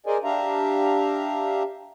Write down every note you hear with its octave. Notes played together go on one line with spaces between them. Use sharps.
G#4 A#4 C5 D5 D#5 G#5
D4 G4 E5 F5 A#5